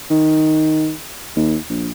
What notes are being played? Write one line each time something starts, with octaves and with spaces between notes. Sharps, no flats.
D#3
D#2
A#1